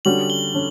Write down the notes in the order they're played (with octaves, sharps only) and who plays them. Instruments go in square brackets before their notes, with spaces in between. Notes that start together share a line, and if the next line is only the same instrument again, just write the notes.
[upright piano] D3 G3 C#4 F#4 [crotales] F#7
[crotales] G7
[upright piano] D3 C#4